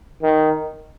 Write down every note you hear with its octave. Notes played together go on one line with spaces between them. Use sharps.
D#3